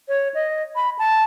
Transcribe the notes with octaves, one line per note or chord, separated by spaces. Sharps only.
C#5
D#5
B5
A5